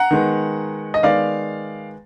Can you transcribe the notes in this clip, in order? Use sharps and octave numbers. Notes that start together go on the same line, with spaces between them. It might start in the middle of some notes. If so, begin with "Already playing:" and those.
Already playing: F#5 A#5
D#3 G#3 B3
D#5
D#3 G#3 B3 D5 F5